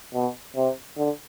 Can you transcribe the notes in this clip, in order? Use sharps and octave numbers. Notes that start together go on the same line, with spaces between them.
B2
C3
D3